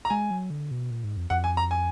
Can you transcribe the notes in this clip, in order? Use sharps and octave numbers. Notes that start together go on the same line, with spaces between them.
A#5
G#3 G#5
F#3
D3
B2
A#2
G#2
F2
F2 F#5
G#5
A#5
G#5